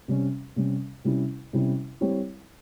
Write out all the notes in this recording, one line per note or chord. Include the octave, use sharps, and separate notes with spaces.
C3 G3 C#4
C3 G3 C#4
C3 G3 C#4 E4
C3 G3 C#4 E4
G3 C4 E4 G4 C#5